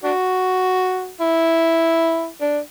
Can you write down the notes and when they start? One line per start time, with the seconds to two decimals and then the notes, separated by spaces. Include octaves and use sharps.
0.04 D4 F#4
1.21 E4
2.41 D4